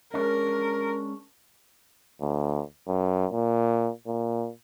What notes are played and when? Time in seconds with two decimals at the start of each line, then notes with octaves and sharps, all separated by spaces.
0.14 G#3 C#4 D4 A#4
2.21 D2
2.88 F#2
3.32 A#2
4.07 A#2